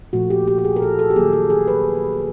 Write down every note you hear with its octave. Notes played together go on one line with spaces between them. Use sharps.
A#2 F3 A3 F#4
G4
G4
G4
G#4
A#4
A4
A4
G4
D#3 F#3 A#3 G#4
A4
G#4
B4